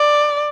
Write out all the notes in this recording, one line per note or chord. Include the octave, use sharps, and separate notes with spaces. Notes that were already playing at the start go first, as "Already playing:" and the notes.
Already playing: D5